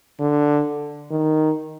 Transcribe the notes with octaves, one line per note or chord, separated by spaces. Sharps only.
D3
D#3